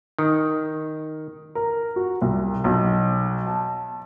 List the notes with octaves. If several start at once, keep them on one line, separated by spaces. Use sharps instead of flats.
D#3
A#4
F#4
C2
B1
A5